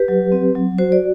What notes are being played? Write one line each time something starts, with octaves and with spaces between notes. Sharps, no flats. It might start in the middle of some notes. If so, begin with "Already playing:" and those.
Already playing: G4 B4
F#3
C4
F#3
F#4 C5
D5